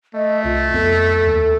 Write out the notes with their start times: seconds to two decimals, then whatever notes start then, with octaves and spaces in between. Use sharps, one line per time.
0.15 A3 D#5
0.44 C2 F4
0.74 F2 B3 A4
1.27 D#2